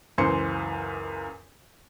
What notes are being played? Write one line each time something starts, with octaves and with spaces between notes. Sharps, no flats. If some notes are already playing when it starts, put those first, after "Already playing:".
C#2 F#2 E3 C5 C6 C#7